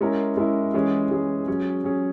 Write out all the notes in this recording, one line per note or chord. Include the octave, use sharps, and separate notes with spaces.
G#3 C#4 E4 A#4
G#3 C#4 E4 A#4
E3 G#3 C#4 G#4
E3 G#3 C#4 G#4
F#3 C#4 G#4
F#3 C#4 G#4